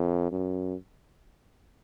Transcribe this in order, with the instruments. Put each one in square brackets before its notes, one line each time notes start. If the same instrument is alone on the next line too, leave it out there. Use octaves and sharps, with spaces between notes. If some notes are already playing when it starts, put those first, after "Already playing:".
Already playing: [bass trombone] F2
F#2